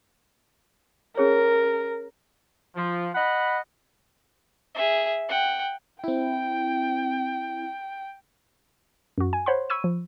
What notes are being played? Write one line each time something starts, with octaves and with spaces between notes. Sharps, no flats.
C#4 G#4 A#4 C#5
F3
D#5 F#5 B5
G#4 E5
F#5 G5
C4 E4 G5
F#2 F#4
G#5
C5 C#5 F#5 B5 C6
B5 C#6 E6 G#6 D#7
F3